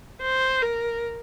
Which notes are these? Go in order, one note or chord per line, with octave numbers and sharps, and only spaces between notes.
C5
A#4